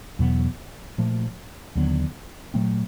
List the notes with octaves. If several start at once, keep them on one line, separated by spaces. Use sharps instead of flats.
E2 B2 F#3 B3
A#2 F3 A3
D#2 D3 F#3 B3
A#2 F#3 A3 C4